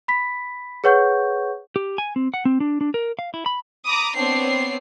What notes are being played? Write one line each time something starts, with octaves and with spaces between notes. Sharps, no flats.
B5 B6
G#4 B4 C#5 F#5 C#6 G6
G4
G#5
C4
F#5
C4
D4
D4
A#4
F5
E4
B5
A#5 B5 D6 D#6
B3 C4 D4 C#5 C7